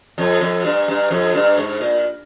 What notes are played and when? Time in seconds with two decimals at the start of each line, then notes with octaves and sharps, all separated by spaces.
0.18 F2
0.41 F2
0.65 G2
0.88 G2
1.11 F2
1.35 G2
1.58 G#2
1.81 A#2